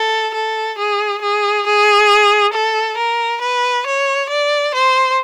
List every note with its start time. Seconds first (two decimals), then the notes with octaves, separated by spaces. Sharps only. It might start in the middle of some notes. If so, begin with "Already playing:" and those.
Already playing: A4
0.34 A4
0.78 G#4
1.22 G#4
1.66 G#4
2.53 A4
2.97 A#4
3.42 B4
3.86 C#5
4.29 D5
4.74 C5